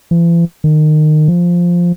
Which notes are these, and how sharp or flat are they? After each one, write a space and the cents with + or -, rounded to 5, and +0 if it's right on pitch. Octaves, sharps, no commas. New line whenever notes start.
E3 +45
D#3 -25
F3 +0